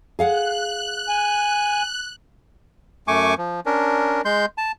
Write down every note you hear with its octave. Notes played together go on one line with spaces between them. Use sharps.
G#4 F5 F#5 F#6
G#5
F#2 A3 G#5 C#6 D6
F3
C#4 D4 A#4
G#3 C6 G6
A5